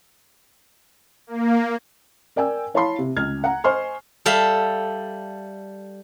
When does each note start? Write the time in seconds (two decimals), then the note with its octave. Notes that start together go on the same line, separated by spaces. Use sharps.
1.27 A#3
2.36 A#4 D5 G5 G#5 E6
2.74 E4 C#5 F5 A5 B5 C6
2.98 C3
3.16 C#2 F6 G#6
3.44 F#5 A#5
3.64 C5 D#5 G#5 C6 C#6 F6
4.26 G3 A4 E5 F5